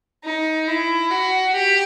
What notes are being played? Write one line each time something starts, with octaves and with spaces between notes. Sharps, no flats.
D#4
E4
F#4
G4